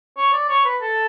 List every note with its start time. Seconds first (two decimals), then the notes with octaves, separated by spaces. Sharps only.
0.17 C#5
0.33 D5
0.49 C#5
0.65 B4
0.81 A4